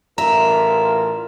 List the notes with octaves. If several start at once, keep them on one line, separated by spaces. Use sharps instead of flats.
A1 F4 A#4 E5 A#5